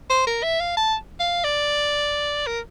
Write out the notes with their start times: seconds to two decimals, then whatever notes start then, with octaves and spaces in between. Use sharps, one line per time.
0.10 C5
0.27 A#4
0.43 E5
0.60 F5
0.77 A5
1.20 F5
1.44 D5
2.46 A#4